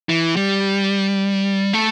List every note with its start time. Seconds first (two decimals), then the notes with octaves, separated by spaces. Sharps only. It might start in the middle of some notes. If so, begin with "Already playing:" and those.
0.09 E3
0.36 G3
1.73 A3